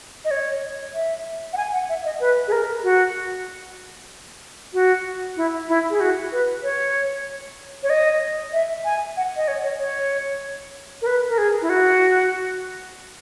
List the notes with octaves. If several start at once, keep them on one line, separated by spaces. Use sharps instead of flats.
D#5
C#5
E5
F#5
G#5
F#5
E5
D#5
B4
G#4
A#4
F#4
F#4
E4
E4
G#4
F#4
B4
C#5
C#5
D#5
E5
G#5
F#5
D#5
C#5
C#5
C#5
A#4
B4
A#4
G#4
E4
F#4